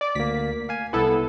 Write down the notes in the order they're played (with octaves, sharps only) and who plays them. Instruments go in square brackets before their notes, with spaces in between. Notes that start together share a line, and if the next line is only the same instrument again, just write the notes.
[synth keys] D5 D6
[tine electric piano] D2 A#3 [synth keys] B6
[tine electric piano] F5 G#5
[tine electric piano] C2 B5 [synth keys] B3 E4 A4